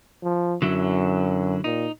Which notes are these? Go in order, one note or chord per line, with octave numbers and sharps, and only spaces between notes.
F3
F#2 D3 F#3 E4
A#2 D#4